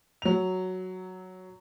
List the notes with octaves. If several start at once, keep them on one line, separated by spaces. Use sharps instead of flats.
F#3 F7